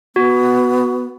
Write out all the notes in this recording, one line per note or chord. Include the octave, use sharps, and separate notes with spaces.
B3 F#4